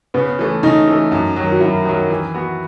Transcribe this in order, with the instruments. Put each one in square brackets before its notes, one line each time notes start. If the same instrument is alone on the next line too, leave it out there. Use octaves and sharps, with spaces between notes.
[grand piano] C#3 [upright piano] B3
[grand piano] E3 A3
[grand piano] C#3 [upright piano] D#4
[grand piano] E3 A3
F#2
D#3 F#3
[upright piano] F#4
[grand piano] F#2 [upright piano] E4
[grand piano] D#3 F#3
E3
B3 F#4